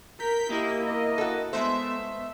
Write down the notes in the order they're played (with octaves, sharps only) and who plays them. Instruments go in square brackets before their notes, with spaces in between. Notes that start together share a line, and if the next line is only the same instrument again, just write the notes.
[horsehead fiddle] A#4 [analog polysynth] G6 B6
[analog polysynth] A#3 E4 [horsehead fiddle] G4 D#5
[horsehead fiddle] A#4 D#5
[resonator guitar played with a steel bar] F#4 A4
[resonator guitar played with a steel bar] G#3 A3 C5 [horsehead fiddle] B3 [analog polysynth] E5